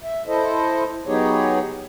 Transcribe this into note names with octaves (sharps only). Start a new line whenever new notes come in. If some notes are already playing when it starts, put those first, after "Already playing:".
E5
E4 A4 C5 D#5
F#3 B3 D#4 G4 G#4 C#5